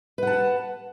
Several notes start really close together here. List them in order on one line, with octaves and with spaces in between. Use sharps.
B4 F#5 A5